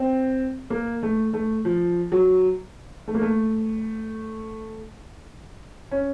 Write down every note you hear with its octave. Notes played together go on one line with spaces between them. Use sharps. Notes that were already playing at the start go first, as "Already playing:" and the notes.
Already playing: C4
A#3
A3
A3
F3
F#3
A3
A#3
A3
C#4